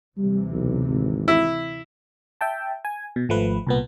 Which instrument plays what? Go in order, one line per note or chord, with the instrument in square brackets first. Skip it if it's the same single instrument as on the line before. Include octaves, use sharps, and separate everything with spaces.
[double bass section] D2 C3 E3 [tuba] G3
[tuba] B1
G#1
[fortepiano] E4
[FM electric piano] E5 G5 A5
G#5
B2
G#1 F3 A3 B4
C2 A#2 B3